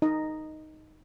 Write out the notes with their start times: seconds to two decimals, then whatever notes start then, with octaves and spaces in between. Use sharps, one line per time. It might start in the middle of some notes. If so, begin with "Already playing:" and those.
0.02 D#4 D#5